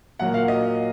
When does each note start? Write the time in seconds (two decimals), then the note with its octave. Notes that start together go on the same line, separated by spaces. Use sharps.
0.19 A#2 F#3 A#3 F#5
0.34 F5
0.48 D#5